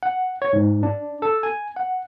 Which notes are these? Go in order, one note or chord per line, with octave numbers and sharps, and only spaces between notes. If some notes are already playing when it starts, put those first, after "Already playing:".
F#5
C#5
G#2
D4
A4
G#5
F#5